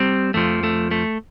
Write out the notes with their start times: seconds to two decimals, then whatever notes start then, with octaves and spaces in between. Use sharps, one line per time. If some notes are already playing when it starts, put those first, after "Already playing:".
Already playing: G3 C4
0.34 F2 F3 A3
0.63 A3
0.91 A3